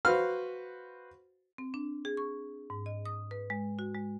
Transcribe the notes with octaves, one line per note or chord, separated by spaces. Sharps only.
F#4 B4 C5 F5 F6
C4
D4
G#4
C#6
G#2
D#5
D#6
B4
G#3
F#4
G#3